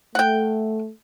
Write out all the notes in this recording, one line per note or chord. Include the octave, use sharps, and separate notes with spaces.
A3 F#5 G5